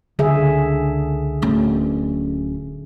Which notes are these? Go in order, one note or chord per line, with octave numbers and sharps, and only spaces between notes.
C#2 D3 G#4 E5
D1 C#4